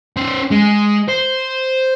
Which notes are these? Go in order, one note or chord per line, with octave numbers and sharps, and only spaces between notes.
C#4 C5
G#3
C5